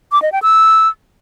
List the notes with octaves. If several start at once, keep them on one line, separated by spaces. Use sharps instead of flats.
D6
D#5
G5
E6